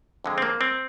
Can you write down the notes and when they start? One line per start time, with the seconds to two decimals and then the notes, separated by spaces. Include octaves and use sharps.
0.24 F2 D3 G#3
0.38 C4
0.42 A#3
0.61 C4